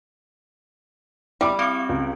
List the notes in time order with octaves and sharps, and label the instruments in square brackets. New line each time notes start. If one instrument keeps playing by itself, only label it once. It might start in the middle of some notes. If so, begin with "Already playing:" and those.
[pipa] G3 [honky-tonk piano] E4 D6
[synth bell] C4 D7 [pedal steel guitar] F#4 F5 C#6
[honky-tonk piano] C#2